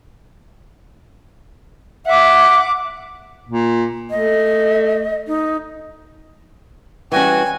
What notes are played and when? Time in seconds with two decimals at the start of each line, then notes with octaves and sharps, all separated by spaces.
2.06 E5 F#5 D6
3.49 A#2
4.10 A3 D#5
5.27 D#4
7.12 E3 G3 C#4 F#4 G5 G#5